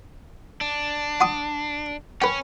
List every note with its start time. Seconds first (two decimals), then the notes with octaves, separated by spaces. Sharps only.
0.61 D4
1.20 F#5 C6 D#6
2.22 C#4 B4 G5